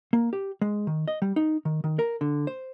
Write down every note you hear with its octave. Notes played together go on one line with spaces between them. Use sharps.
A#3
G4
G#3
D#3
D#5
G3
D#4
D#3
D#3
A#4
D3
C5